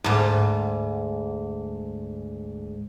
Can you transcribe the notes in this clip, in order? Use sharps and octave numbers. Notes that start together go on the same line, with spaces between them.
D2 G#2